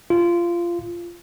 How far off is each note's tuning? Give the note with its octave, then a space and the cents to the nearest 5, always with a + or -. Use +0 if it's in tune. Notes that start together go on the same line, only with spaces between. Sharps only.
F4 -15